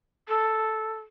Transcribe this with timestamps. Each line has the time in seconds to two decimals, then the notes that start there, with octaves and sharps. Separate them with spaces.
0.28 A4